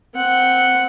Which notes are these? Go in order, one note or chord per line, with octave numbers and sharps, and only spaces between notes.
C4 F#5